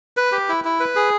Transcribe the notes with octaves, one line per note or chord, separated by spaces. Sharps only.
B4
G4
E4
E4
B4
G#4